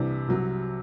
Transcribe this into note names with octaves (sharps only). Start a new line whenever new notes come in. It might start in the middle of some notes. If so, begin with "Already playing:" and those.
Already playing: C2 C3 E3 D4
C2 C3 F#3